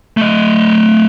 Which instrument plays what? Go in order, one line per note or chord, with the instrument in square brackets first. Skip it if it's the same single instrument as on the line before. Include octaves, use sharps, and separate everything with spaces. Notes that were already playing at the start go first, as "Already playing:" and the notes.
[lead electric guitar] A3 D#5